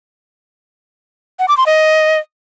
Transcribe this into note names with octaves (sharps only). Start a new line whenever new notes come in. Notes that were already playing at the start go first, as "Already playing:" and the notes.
F#5
D6
C6
D#5